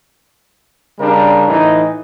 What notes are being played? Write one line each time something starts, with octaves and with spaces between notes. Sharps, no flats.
C#3 G3 D4 A#4
A2 E3 D#4